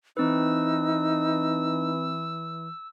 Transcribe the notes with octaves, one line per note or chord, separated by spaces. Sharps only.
E3 C4 D#4 B4 E6